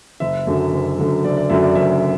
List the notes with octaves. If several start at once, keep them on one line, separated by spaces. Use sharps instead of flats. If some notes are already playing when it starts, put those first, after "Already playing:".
F#1 E5
F#2 D3 F#3
F#1
F#2 D3 F#3
F#1 D5
D5
F#2 D3 F#3 E5
D5
F#1 E5